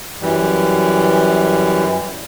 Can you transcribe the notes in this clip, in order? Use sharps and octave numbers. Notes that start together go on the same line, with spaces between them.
F#2 E3 G3